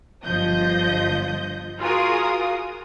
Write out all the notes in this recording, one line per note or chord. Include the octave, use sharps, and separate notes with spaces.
G1 F3 D#5 G6
F4 F#4 G#4 A#4 D#6